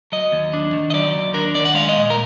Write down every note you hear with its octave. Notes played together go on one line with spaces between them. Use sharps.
F#3 D#5
D#2
D4
D#3
D#5
F#3 D5
D#2
D4 A#4
D#3 D5
F#5
G#3 F5
D#5
A#2
A#4